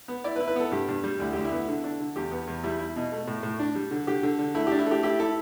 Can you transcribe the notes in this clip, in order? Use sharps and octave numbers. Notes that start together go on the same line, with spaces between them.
B3
E4 D5
B4
E4
B4
B3 A4
G2 G4
G2
G3
D2 E4
D2 G4
E4
B3
D3
D4
D3
E2 G4
B3
E2
G3 E4
E4
B2
A3
A2
A2
D4
G3
D3
D3 G4
D3
D3
A3 E4
D4 G4
E4
A3 G4
E4 G4
E4 A4